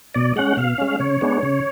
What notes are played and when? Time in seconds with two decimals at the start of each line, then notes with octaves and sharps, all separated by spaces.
0.14 B2 D5
0.36 G#3 C#4 F#5
0.57 B2 F5
0.78 G#3 C#4
1.00 C#3 C#5
1.21 G#3 B3 D4
1.43 C#3